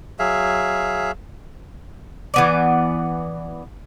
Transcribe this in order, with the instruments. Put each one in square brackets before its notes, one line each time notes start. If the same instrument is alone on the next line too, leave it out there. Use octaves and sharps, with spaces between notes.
[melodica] F#3 G#4 E5 F5
[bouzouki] E3 B3 D5